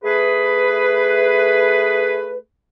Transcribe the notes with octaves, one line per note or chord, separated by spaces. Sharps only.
A3 G#4 B4